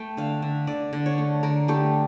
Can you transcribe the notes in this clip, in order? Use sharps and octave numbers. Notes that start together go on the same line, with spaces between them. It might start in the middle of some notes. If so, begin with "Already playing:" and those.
Already playing: A3 G5
D3 F5
D3 E5
D3 D5
D3
C#5
A3
D3 A#4
A3 G4